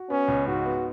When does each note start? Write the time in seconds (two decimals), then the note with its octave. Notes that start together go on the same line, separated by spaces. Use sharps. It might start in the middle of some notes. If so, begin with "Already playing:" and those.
Already playing: F#4
0.10 B3 C#4
0.28 C#2
0.46 G#2 F#4
0.66 B3